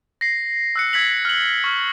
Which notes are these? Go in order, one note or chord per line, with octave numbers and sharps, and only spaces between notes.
A#6 C7
E6 F#6 C#7
E6 G#6 B6 F#7
F6 F#7
C#6 F6